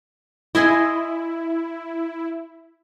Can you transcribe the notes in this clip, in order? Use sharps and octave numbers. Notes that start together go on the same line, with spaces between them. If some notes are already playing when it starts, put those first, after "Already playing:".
E4 D#5 G#5 C6